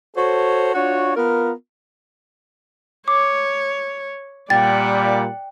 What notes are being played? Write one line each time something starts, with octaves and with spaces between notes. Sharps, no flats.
F#4 A4 C5 C#5
D4 F4 F#4 C#5
B3 F4 A#4
C#5 D6
A#2 G3 D5 F#5 G5 A6